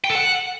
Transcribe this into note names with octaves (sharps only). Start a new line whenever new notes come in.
G5
A4
F#5